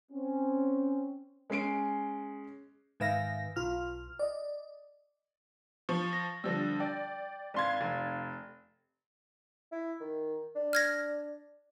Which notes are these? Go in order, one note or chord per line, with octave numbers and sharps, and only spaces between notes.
C4 C#4
G#3 C#4 C7 D7
G#2 D#3 B4 E5 F5 A#6
B1 F4 F6
D5 D#5
F3 C#6
A#6
D3 F3 G3 E6 A#6
D5 G5
G#1 D5 F5 C6 G#6
F1
E4
D#3
D4
F6 G#6 A#6